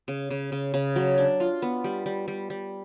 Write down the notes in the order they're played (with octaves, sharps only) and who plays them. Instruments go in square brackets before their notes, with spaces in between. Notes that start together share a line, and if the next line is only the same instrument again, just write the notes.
[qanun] C#3
C#3
C#3
C#3
F#3
D4
F4
B3
G3
G3
G3
G3